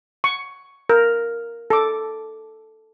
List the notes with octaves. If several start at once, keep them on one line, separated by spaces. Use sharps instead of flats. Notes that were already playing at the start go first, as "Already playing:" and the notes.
C#6
A#4
A4 D6